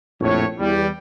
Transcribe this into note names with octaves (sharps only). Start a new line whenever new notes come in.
A#1 F2 A2 C#5
E2 G3